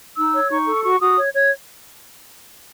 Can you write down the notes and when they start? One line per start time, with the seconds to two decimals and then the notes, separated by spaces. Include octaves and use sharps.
0.16 D#4 E6
0.33 C#5
0.49 D#4 C#6
0.66 A4
0.83 F#4 C#6
1.00 F#4 D#6
1.16 C#5
1.33 C#5